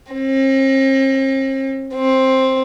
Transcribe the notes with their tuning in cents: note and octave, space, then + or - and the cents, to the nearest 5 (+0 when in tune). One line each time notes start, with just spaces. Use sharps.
C4 +45
C4 +10